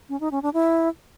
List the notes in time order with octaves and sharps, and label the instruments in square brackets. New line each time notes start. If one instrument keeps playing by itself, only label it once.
[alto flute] C#4
D#4
C#4
D4
E4